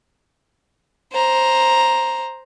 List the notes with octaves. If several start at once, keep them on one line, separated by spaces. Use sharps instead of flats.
C5 A#5